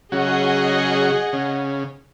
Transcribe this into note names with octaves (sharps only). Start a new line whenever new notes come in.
C#3 F#3 F#4 G#4 D#5 F#5
C#3